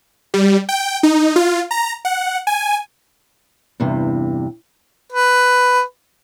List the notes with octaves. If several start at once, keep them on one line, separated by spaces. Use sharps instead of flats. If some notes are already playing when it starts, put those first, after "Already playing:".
G3
G5
D#4
F4
A#5
F#5
G#5
E2 G2 C3
B4